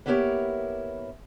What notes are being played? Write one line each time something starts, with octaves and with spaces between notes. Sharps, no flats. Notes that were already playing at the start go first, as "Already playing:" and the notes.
A#3 B3 E4 G4 A#4 C#5